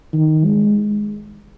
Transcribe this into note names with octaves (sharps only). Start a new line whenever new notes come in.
D#3
G#3